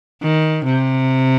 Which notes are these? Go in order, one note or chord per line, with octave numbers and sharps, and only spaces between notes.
D#3
C3